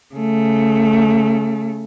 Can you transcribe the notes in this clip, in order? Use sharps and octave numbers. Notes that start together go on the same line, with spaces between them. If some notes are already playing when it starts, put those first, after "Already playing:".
C#3 A3